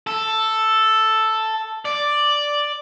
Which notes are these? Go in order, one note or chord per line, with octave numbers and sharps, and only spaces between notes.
A4
D5